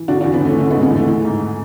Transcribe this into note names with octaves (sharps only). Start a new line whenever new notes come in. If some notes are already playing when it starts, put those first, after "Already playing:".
Already playing: E3
D3 D4 F#4
D4 F#4
E2
B3 D4
E2 A3 C#4
D3 A3
G#3 B3
D3
G#3 B3
E2
A3
E3
G#2